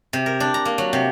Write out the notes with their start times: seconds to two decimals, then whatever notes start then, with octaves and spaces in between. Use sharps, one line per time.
0.13 C3
0.26 A#4
0.40 D4
0.54 A#5
0.65 A#3
0.78 F#3
0.93 C3